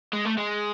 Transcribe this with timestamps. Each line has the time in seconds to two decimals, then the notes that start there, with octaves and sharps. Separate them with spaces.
0.13 G#3
0.25 A3
0.37 G#3